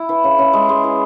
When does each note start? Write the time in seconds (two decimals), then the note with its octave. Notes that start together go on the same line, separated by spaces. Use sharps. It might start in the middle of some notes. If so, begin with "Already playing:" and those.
Already playing: E4
0.09 E3
0.24 C#3
0.39 C#3
0.53 G#3
0.69 G#3
0.84 E3